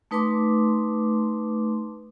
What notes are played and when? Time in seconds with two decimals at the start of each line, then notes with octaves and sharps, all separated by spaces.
0.11 A3 D#4 B4 A5 C6 D6